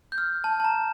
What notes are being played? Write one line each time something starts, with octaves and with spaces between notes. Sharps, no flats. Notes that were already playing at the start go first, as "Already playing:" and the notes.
G6
F6
A5
A5
A#5